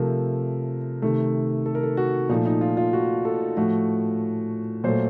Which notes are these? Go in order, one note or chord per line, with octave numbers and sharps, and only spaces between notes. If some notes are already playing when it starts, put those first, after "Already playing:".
Already playing: C3 F3 A3 A#4
C3 D#3 A3
A4
A#4
A4
F#4
A#2 F3 A3 D#4
D#4
F4
F4
F#4
A4
A2 F3 A3 F#4
A#2 F#3 A3 C5